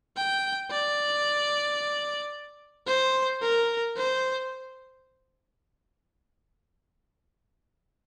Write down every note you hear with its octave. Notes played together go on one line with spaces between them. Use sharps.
G5
D5
C5
A#4
C5